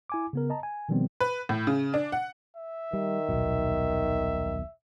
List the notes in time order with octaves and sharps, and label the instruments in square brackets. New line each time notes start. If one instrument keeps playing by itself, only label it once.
[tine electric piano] E4 G#5 D6
C#3 B3 A#4
D#5 A5 A#5
G#5
B2 D#3 F3 G3 B3 C4
[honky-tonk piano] B4
A2
C#3
D4
F#5
[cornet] E5
[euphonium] D#3 [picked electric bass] G3
[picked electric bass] D#1 B1 B2